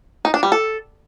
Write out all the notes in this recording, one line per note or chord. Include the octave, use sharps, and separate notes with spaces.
D#4
D4
G3
A4